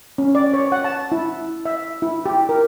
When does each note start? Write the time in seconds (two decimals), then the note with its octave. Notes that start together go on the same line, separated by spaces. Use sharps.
0.18 C#4
0.35 D5
0.54 C#5
0.72 F#5
0.84 A5
1.12 E4
1.66 E5
2.02 E4
2.26 G4
2.49 A#4